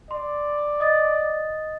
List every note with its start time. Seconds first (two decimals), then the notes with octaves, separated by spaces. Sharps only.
0.11 D5 C6
0.80 D#5 D#6 A6